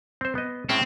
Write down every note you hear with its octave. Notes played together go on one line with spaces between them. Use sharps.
C4 C5
B3 D#5
A2 G#3 C4 C#4